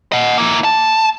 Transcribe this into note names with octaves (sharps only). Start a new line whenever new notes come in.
D#5 F#5
A#3 E4
A5